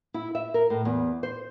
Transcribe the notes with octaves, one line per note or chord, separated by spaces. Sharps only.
E4
E5
A#4
A2
E2
C5